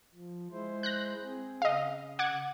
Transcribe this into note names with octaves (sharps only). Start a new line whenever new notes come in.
F3
G#3 E4 C5
F#6 G6 A#6
C4 G#4
C#3 D#5 F5
F#5 D6 G#6